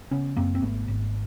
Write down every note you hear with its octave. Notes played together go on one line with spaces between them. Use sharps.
C#3 B3 C#4
F#2 A#3 C4
C4
G#1 A3 B3
G#1